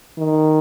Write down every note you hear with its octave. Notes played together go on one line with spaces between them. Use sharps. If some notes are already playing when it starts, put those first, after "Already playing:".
D#3